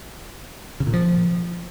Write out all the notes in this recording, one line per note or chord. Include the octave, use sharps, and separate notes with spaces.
C#3
A#2
F3